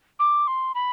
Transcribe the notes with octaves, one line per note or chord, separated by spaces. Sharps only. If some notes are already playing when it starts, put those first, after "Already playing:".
D6
C6
B5